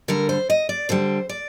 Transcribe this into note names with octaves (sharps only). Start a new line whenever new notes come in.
D3 G3 A#4
C5
D#5
D5
D3 G3 C5
D5